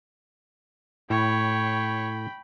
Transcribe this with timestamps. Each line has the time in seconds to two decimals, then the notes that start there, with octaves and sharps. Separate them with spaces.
1.10 A2 C#5 G5 B5